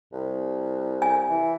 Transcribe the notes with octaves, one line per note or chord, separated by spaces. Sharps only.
C2
G#5
E3